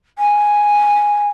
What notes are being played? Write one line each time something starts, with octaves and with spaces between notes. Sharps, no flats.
G#5